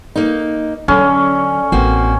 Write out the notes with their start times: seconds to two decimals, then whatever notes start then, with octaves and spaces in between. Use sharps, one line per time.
0.16 A#3 D#4
0.88 D3 F#3 C#4
1.72 A1 A#3 C4 F#4